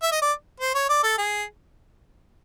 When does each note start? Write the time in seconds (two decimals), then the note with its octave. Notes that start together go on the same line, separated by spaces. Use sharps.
0.02 E5
0.12 D#5
0.22 D5
0.60 C5
0.75 C#5
0.89 D5
1.03 A4
1.18 G#4